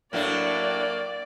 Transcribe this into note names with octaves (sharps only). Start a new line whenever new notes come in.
A2 F#3 A#3 D4 D5